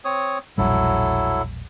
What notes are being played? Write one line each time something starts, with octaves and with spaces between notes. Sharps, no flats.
C4 C#5 D#6
E1 A#1 F#3 G3 E4 A4